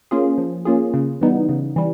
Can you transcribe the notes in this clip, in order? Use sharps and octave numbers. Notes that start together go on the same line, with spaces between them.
A#3 C#4 F4 G#4
F3
A#3 C#4 F4 G#4
C#3
E3 G3 B3 D#4
C#3
E3 G3